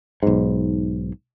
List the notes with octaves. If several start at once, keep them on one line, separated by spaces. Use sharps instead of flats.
B1 G#2